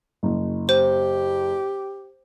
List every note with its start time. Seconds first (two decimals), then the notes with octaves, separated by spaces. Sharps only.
0.23 F#1
0.69 G4 C5